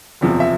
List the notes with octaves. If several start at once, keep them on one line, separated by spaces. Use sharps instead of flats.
F#1 E2 C3 F3
E5